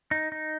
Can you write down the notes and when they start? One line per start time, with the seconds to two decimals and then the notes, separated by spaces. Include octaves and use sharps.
0.11 D#4
0.32 D#4